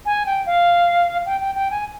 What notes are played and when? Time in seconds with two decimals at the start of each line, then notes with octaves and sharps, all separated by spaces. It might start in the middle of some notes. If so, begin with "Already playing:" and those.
0.06 G#5
0.26 G5
0.46 F5
1.26 G5
1.41 G5
1.55 G5
1.71 G#5